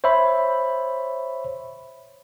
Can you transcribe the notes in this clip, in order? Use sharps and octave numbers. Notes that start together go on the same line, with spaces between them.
C5 C#5 E5 B5